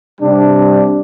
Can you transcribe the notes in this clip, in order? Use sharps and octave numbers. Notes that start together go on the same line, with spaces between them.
C3 G3 D4